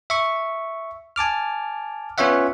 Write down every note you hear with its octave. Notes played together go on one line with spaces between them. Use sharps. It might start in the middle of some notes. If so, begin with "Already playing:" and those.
E5 C#6
G#5 A5 D6 F6
B3 C#4 F4 C#5 E5 F#5